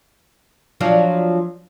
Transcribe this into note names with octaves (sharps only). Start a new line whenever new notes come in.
F3 F#3 D4